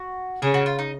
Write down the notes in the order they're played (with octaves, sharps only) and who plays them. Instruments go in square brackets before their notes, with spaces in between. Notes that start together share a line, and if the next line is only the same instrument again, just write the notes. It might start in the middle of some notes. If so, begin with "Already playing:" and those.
Already playing: [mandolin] F#4
[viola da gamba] C#3 [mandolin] G#4
[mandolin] F#4
F4
D#4